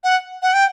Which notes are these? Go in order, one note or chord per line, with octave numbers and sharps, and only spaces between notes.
F#5
F#5
G5